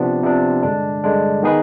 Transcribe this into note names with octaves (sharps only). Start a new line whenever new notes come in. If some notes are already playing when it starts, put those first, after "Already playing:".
Already playing: C3 F3 B3 D4
C3 F3 B3 D4
G2 D3 G#3 D4
G2 D3 G#3 D4
D#3 B3 D#4 G#4 B4